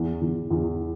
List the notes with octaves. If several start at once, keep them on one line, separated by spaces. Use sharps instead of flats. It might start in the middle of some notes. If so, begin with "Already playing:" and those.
Already playing: E2
E2
E2